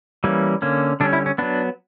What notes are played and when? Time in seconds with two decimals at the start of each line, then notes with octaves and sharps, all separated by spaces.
0.24 E3 G3 A#3 C#4
0.62 D3 A#3 C#4
1.00 D3 G3 C#4 D4
1.13 E4
1.26 C#4
1.38 F#3 B3 D4